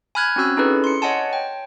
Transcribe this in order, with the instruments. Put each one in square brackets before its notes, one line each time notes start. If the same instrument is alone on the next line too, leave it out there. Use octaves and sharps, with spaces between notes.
[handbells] G#5 B5 F6 F#6 G#6
C4 C#4 F#4 E6 F#6
C#4 D#4 E4 G#4 A4 B4
C6 C#7
C#5 D#5 F#5 G#5 A5
G5